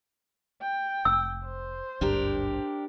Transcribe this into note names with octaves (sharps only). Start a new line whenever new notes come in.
G5
F1 E6
C5
G#1 D2 G2 D4 G4 A#4